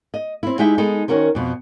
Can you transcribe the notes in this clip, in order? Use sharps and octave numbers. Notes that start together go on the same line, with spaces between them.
D#5
C4 E4
G#3 D#4 E4 G4 E5 G5
G#3 B3 D#4 A4
D#3 C#4 F#4 A#4 C5
F2 B2